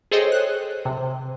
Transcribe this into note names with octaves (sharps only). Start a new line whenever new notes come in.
G#4 A4 C5 C#5 D#5 G5
F#6
C3